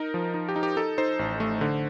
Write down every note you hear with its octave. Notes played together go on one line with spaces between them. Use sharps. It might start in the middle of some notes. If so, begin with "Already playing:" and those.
Already playing: D#4 A#4
F3
D#4
G4
D#4
G4
D#4 A4
D#4 C5
A1
A3
D3